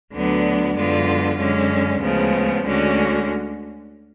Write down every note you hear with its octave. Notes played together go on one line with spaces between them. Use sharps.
D2 D3 F#3 B3 D4
F#2 D3 G#3 B3 F4
F#2 D3 G#3 C#4
D2 C#3 F3 G#3 B3
D2 D3 G#3 C#4 F#4